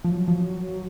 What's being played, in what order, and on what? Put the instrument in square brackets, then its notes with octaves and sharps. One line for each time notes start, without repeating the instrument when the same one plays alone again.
[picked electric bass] F3 [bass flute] F#3
[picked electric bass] F3